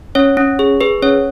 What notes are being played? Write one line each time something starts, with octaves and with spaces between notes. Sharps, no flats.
C#4 C#5
C#4
G#4
G#4 B4
C#4 C#5